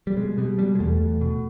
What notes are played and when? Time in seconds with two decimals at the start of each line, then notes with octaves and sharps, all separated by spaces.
0.07 G3
0.16 B2 G#3
0.38 B2 G3
0.58 B2 G3
0.75 G#3
0.79 E2 A3
1.01 E2
1.21 B2